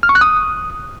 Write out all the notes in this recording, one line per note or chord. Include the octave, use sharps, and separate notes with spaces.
F6
C#6
F#6
D#6